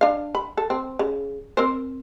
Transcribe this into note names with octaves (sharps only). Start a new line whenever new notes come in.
D4 F5
B5
A4
C4
C#3
C4 A#4 C5